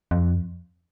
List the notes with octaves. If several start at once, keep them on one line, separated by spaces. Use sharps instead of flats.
F2